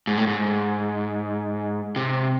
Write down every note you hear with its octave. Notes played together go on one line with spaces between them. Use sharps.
G#2
A2
G#2
C3